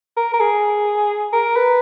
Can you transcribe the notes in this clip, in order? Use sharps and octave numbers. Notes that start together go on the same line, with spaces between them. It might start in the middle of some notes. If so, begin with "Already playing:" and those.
A#4
A#4
G#4
A#4
B4